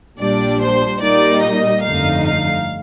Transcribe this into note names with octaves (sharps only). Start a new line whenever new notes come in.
A#1 A#2 G3 D4 D5
C5
A#2 G3 A#3 D#4 D5
D#5
G1 F2 D3 A3 D#4 F5
F5